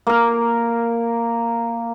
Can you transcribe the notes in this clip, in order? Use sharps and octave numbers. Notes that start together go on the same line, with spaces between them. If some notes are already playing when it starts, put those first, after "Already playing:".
A#3 A#4